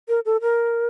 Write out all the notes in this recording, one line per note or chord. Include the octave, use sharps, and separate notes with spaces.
A#4
A4
A#4